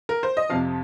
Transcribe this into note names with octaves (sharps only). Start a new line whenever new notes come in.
A#4
C5
D#5
F2 C3 F3 F5